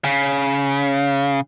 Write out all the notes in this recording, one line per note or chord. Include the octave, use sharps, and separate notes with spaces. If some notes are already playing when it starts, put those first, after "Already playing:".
C#3